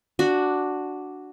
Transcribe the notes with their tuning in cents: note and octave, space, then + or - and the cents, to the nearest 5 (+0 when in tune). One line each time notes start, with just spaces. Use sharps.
D4 +0 F#4 +0